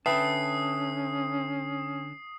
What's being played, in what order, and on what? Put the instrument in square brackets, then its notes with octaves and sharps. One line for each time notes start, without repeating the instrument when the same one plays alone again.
[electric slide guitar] D3 A5 [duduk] C#4 [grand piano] B4 E5 G5 [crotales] D#6 C7